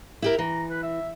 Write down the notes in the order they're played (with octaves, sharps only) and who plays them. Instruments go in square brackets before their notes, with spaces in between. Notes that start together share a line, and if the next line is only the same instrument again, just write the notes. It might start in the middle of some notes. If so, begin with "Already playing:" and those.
[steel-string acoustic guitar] E4 G4 A#4
[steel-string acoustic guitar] E3 [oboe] A#5
[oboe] B4
E5